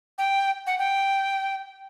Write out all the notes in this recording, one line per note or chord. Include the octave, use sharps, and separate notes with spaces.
G5
F#5
G5